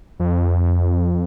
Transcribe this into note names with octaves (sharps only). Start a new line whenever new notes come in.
F2